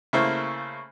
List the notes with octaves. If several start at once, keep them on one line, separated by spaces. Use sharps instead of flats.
C#3 A3 A#3 E4 C5